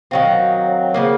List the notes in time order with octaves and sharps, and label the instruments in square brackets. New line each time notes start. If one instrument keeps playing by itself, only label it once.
[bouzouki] D#3 F#3 C4 [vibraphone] F5
[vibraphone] F#5
F#5
F5
C#5
F5
[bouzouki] C#3 F3 A#3